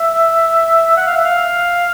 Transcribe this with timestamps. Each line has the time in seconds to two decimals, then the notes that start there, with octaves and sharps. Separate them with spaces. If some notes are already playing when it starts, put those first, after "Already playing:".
Already playing: E5
0.97 F#5
1.07 F5
1.17 E5
1.25 F5